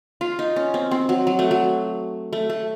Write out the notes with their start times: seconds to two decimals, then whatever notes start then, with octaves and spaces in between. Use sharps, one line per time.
0.21 F4
0.39 D#4
0.56 C#4
0.74 C4
0.91 C4
1.09 F#3
1.27 F#3
1.39 A3
1.51 F#3
2.33 A3
2.50 A3